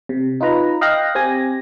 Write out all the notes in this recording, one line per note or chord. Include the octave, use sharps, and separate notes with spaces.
C3
D#4 F4 B4 A#5
D#5 F5 G5 F#6 A#6
C4 G4 G#5 A#6